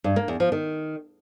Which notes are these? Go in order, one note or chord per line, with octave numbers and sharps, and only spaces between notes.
G2
A#3
E2
F3
D#3